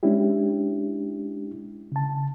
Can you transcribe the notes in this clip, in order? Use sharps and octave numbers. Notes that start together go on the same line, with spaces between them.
G#3 C#4 D4 E4 G4
C#3 A5